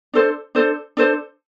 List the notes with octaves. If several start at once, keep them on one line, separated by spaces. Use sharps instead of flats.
D4 A4 C5
D4 A4 C5
D4 A4 C5